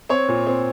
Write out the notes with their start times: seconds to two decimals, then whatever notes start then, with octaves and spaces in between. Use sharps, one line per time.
0.10 C4 C#5
0.28 A#2
0.47 C4